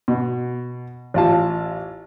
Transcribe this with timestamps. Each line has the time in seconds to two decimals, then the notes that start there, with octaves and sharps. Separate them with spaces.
0.08 B2
1.14 A1 F4 A5